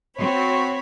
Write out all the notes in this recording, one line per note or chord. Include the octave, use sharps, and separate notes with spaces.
C4 F#4 C#5 B5